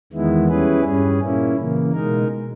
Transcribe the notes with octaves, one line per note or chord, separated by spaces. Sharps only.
E2 D#3 G#3 B3 E4
G3 C#4 E4 G#4 B4
G2 G3 C#4 G#4
A#2 A#3 C#4 E4
C#3 E3 A#3
B2 G#3 D#4 A#4